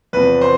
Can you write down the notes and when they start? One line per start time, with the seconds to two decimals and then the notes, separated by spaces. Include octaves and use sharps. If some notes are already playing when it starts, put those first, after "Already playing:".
0.13 E2 C3 F3 B4
0.41 C5